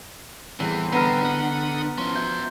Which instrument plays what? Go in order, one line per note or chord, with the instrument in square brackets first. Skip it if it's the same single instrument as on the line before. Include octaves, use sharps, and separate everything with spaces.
[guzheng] E2 [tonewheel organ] A2 G3 C4 [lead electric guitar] E3 [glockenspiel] F#7
[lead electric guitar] D3 [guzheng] B3 D#5 [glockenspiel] A#5 F6
[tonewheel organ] B4 F#5 D#6
[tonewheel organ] F3 [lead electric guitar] C#4 E4 [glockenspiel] C6 G7
[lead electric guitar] F#4 E5 [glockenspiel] G6